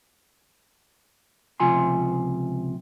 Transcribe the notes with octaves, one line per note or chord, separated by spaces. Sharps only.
C#2 C3 F3 F4 G#5 C6